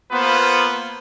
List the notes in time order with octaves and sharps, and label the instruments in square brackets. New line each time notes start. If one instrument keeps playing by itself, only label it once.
[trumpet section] A#3 B3 F4 B4 C5